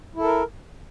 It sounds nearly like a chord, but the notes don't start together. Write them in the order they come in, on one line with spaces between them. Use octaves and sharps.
E4 A4 A#4